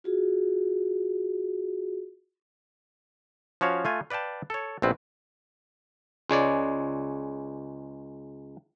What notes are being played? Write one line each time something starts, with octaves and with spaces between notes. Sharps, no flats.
F4 F#4 G#4
F3 C#4 F#4 C#5 F5
A3 F4 G#5
B4 D5 F5 G5 A5
A4 C#5
A#1 B2 C4 E4 B4
C#2 G#3 C#5 D5